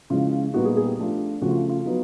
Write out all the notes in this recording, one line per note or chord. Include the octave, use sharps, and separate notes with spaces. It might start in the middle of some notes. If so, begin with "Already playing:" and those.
C#3 F3 G#3 C#4 E4 F4
A#2 G3 B3 D#4 F#4
G#4
G#4
G4
F3 A3 D4 F4
C#3 F3 A3 C#4 F#4
F4
F4
F#3 B3 D#4